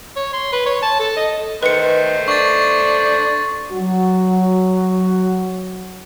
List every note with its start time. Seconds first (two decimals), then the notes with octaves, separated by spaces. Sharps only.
0.16 C#5
0.33 C6
0.52 B4
0.66 C#5
0.82 A5
1.00 A4
1.16 D#5
1.63 D#3 A3 B4 C5 C#7
2.28 D4 C#6 A6
3.71 F#3 F#4